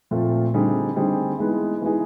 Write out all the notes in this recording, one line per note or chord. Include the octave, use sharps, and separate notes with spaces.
A#2 F3 A3 C4 F4
D3 G3 C4 D#4 G#4
D3 G3 C4 D#4 G#4
E3 G#3 B3 D#4 G#4
E3 G#3 B3 D#4 G#4